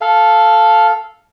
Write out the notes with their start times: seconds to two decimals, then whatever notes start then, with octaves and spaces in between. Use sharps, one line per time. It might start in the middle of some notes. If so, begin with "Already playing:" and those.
0.01 A4 F5